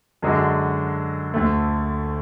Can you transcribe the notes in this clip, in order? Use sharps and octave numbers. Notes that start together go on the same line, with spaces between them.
F#2 D3 G#3 D4 F#4
D2 D3 A3